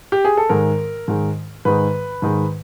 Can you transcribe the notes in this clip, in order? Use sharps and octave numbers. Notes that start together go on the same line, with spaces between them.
G4
G#4
A4
G#2 D#3 G#3 A#4
G#2 D#3 G#3
G#2 D#3 G#3 B4
G#2 D#3 G#3